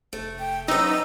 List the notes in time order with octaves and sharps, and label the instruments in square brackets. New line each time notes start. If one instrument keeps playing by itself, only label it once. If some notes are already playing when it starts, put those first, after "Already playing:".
[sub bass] F1 [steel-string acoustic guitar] A3
[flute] G5
[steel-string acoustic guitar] F#2 B4 [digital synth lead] D#4 [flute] E6